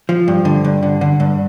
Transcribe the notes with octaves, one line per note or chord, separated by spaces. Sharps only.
F3
G2
D3
G2
D3
D3
G2